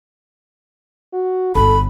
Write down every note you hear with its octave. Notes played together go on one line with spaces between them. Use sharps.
F#4
G1 E2 A4 B5